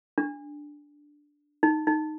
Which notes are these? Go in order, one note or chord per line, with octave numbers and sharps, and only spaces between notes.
D4
D#4
D#4